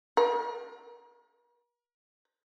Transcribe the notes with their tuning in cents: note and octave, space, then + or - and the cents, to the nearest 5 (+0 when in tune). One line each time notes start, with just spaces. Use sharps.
A#4 +45